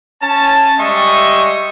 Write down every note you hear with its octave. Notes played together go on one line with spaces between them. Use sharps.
C#4 A5
G3 G#3 D#5 E5 C#6